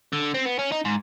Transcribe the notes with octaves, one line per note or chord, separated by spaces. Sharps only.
D3
C4
B3
C#4
D#4
G#2